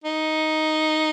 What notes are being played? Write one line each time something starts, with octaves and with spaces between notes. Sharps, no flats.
D#4